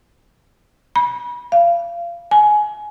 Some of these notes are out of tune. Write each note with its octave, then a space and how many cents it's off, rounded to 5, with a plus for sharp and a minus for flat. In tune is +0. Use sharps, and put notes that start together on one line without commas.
B5 -30
F5 -25
G#5 +20